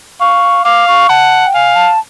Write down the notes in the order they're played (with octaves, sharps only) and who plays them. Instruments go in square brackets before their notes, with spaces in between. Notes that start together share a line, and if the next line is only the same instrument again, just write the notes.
[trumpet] F5 [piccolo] C#6
[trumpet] F5 [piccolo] D6
[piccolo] C#6
[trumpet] F#5 [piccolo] A5
[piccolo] G5
[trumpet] F5 [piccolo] G#5
[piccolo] A5